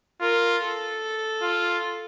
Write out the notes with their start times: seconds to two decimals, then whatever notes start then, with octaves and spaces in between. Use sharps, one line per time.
0.21 F4 A#4
0.62 A4
1.42 F4